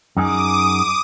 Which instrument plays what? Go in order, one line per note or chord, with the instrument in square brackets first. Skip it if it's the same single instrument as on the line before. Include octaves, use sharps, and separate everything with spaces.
[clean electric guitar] F#2 D#4 G#4 [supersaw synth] D6 D#6